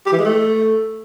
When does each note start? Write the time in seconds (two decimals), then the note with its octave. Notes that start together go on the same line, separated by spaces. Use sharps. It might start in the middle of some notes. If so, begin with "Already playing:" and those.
0.06 G4
0.12 E3
0.18 G#3
0.25 A3